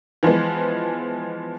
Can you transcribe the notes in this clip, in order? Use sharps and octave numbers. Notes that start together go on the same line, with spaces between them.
E3 F3 G#3 B3